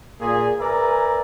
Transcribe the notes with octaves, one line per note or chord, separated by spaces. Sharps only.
A#2 G#4
A#4 B4 D5 E5 G#5 A#5